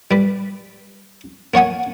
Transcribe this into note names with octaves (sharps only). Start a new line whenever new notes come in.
G3 B4
A#3 C#5 F#5 G#5